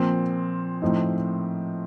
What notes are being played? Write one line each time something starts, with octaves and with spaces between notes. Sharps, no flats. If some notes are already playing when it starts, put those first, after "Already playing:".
Already playing: A#2 F3 C4
A2 F3 C4 D#4